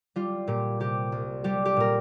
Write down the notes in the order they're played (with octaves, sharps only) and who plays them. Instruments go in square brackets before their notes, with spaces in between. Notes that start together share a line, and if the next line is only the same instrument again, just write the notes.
[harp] G3 F4
A#2 G4
C3 G4
C2
G3 G4
G4
A#2 A#4